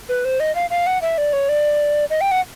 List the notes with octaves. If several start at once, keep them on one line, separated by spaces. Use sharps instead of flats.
B4
C5
D#5
F5
F5
F#5
E5
D5
C#5
D5
D#5
G5
F#5